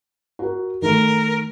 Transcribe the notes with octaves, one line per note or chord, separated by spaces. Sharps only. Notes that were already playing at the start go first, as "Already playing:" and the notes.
F#4 A#4
D#3 A3 A#4